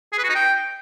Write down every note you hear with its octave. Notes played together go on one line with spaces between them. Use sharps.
G#4
B4
F#4
D#4
G5